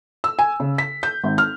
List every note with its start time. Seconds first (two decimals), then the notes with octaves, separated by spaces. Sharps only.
0.24 E6
0.39 G#5
0.60 C#3
0.78 B6
1.03 G6
1.24 G#1
1.38 F6